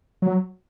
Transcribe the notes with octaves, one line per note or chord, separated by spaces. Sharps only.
F#3